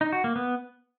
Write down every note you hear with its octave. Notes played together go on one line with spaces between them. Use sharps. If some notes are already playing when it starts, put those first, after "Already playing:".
D#4
F#4
A#3
B3